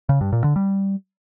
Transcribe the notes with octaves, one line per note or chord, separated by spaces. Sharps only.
C#3
G2
A#2
D3
G3